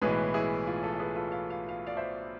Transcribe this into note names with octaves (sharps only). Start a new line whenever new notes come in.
B1 A2 E3 G#3 G#4 B4
E4 G#4
F4
F4 A4
G#4 B4
F4 A4
F5
F5
F5
D5 F5
C5 E5